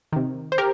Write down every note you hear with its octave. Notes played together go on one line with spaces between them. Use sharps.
C3 D#3
C5
G4 A#4